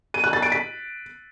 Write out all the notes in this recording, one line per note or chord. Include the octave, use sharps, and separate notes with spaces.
D#7
F#6
A6
D7
B6